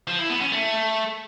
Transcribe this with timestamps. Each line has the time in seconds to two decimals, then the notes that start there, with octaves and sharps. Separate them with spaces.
0.08 F3
0.19 E4
0.30 B3
0.41 C#4
0.52 A3